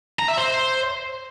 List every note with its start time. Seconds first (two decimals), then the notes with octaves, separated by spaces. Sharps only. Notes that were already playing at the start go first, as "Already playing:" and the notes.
0.19 A#5
0.28 E5
0.37 C5